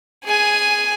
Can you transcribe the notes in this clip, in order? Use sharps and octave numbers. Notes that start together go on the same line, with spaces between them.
G#4 G#5